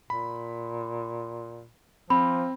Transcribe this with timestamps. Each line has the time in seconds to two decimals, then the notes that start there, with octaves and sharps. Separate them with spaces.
0.10 A#2 B5
2.10 F3 C4 B5